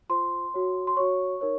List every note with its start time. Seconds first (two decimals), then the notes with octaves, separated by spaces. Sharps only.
0.09 F4 C5 C6
0.54 F#4 C#5
0.87 C6
0.97 F#4 C#5 C#6
1.41 D#4 A#4 C#5